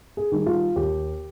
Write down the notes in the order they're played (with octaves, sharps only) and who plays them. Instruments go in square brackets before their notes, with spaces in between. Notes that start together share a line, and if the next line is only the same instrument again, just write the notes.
[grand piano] G#4
D#3 G3
F4
D#2 G4